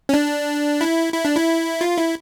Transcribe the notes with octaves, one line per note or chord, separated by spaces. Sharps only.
C#4
D4
E4
E4
D4
E4
F4
E4